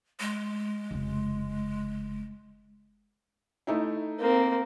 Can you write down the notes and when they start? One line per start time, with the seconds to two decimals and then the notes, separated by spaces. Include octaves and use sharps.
0.20 G#3
0.91 F1 C#3
3.67 A3 D#4 E4
4.20 A#3 C4